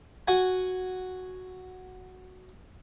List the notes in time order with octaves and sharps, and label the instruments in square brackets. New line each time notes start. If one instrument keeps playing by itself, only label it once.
[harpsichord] F#4 F#5 G#5